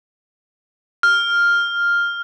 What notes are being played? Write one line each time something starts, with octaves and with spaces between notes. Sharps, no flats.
F6